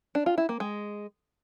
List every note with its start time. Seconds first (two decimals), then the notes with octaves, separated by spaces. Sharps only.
0.15 D4
0.26 F4
0.38 E4
0.49 A#3
0.60 G#3